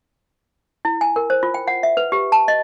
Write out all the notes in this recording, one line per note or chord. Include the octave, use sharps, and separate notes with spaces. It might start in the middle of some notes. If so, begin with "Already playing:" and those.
E4
G#5
A#4
C5
F4
G5
F#5
E5
B4
G4
A5
D#5